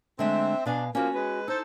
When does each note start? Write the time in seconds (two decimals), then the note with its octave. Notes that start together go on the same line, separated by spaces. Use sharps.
0.19 D3 G#3 A3 C4 E5
0.66 B2 D4 F5 G#5
0.95 F3 A#3 C#4 F#4
1.14 G#3 B4
1.48 D#4 A4 C5